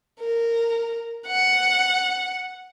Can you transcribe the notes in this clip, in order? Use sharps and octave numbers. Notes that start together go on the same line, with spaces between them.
A#4
F#5